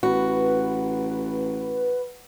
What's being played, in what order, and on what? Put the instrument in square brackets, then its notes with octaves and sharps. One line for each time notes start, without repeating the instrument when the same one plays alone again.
[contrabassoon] A1 [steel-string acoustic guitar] F#4 [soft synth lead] B4